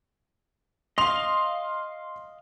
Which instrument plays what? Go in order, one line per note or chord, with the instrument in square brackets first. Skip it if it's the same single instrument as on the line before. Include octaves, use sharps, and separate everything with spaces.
[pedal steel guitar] D#5 F5 [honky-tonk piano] C6 F7